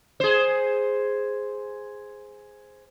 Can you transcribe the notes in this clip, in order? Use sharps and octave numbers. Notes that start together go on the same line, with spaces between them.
G#4 C5